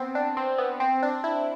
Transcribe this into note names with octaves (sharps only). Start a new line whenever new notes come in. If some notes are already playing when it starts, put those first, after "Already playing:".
Already playing: B3 C4
D4
C4
B3
C4
D4
E4